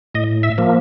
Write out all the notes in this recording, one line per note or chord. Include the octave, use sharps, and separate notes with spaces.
A2 D#5
E5
F3 A#3